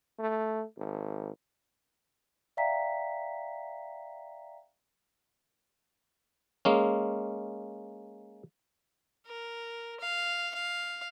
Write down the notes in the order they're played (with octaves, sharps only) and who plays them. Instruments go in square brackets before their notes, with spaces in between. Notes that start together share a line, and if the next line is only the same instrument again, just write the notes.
[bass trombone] A3
G#1
[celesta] D5 E5 F5 G5 A#5 B6
[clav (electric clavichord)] G#3 A#3 C#4
[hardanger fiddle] A#4
F5
F5